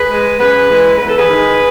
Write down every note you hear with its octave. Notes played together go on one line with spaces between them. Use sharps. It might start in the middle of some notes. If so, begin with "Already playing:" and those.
Already playing: G#4 B4
G#3
F#2 G#4 B4
E3 G#3
E2 B4
A4
G#4 B4
D#3 G#3